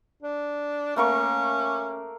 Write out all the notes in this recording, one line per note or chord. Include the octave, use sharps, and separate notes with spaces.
D4
A3 A#3 C#4 C#6